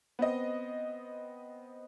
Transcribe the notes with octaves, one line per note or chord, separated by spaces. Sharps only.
B3 C4 D#5